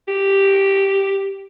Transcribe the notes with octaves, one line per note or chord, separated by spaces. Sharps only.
G4